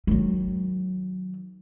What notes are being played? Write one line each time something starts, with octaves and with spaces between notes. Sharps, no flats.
D#3 F#3